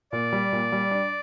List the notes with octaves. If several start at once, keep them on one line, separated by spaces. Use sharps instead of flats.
A#2 D5
G3
A#2
G3
D4